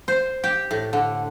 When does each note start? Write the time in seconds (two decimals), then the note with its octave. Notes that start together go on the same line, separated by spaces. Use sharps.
0.08 C5
0.44 G4
0.71 A2
0.93 D3